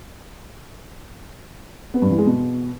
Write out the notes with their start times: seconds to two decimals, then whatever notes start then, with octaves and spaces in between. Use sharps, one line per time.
1.94 B3
2.02 G2
2.10 E3
2.18 G#3
2.26 B2